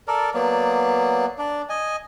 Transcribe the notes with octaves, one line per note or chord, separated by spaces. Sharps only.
A4 A#4 D5
F#3 A#3 B3 D5
D4 D5
D#5 G#5